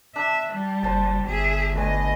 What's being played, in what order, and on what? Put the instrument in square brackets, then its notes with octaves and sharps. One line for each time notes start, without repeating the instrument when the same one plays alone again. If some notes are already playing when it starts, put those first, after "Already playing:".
[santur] D4 [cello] E5
[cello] G3
[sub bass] F#1 [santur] C5 A5
[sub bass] G1 [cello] G#4 E5
[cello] D2 D#5 [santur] B4 G#5